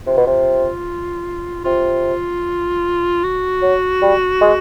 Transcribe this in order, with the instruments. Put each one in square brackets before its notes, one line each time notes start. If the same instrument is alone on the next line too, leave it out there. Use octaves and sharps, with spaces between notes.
[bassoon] C3 [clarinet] F4
[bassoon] B2
C3
[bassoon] C3 [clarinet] F4
[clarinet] F#4
[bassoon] F#3
G3
G#3